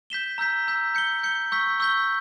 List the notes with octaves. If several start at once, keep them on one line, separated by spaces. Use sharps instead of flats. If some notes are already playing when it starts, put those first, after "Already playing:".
G6 B6 E7 G7
A#5 E6 G6 B6
A#5 E6 G6 B6
G6 C#7 G7
G6 C#7 G7
C#6 E6 G6 B6 G7
C#6 E6 G6 B6 G7